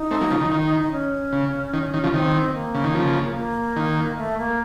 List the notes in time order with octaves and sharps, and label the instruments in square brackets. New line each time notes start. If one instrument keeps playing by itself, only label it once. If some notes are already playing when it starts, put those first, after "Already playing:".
Already playing: [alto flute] D#4
[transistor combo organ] A3 C4
F#3 A#3
C#3 F3
D#3
D#3
[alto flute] C#4
[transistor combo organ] C#3
D#3
D#3
C#3 F3
[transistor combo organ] D#3 [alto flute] C4
[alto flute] A#3
[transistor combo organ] C#3
D#3
C#3 F3
[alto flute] A#3
[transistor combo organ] D#3
[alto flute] A3
A#3